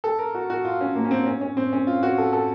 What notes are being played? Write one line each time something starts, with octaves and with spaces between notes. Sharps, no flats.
A4
A#4
F#4
F#4
F4
C#4
A#3
C#4
C4
C#4
C#4
C4
C#4
F4
F#4
A4
A4